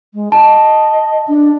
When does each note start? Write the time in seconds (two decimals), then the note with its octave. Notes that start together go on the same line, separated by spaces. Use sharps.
0.14 G#3
0.32 D#5 A5
1.27 D4